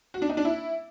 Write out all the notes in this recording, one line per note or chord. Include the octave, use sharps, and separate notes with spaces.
F#4
D4
D#4
D4
E4